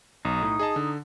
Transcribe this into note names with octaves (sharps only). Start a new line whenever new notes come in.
B1 D#4
A2
G#4 D#5 A5
D3